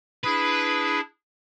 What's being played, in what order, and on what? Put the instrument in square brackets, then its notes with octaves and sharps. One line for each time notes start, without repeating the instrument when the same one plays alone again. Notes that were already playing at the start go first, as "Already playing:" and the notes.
[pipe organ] D4 E4 G#4 [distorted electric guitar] B4